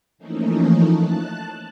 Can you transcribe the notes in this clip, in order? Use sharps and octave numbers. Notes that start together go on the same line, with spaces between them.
E3 F3 A3 A#3 C#4 D#4
A5 F#6